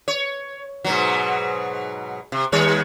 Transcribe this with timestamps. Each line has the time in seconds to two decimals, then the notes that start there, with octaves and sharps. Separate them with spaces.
0.08 C#5
0.84 G#2 B2 F#3
2.32 C3
2.52 D#2 G3 C#5